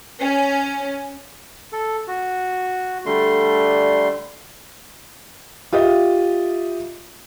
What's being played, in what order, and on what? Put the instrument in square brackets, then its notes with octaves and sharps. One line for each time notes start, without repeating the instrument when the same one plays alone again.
[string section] C#4
[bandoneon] A4
F#4
D3 G3 A3 C6
[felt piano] F4 G4 D#5 E5